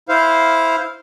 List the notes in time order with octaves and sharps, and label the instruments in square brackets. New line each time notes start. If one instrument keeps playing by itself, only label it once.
[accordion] E4 C5 F5